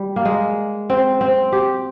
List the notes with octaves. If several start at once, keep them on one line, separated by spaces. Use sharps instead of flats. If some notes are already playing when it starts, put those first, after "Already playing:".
Already playing: G3
A#3
G#3
C4
C4
G4